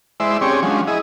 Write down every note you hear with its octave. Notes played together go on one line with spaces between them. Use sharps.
G#3 E4 C5 D5 E5
C4 C#4 G4 G#4 C#5 D5
F3 F#3 G#3 C#4 D4
E4 G#4 D#5